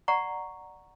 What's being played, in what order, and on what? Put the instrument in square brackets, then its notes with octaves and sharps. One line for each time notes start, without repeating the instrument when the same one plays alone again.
[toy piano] D5 F#5 A#5 C#6